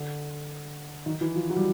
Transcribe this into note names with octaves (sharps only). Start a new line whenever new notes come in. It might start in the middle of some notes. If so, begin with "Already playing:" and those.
Already playing: D3
D#3
E3
F3
F#3
G3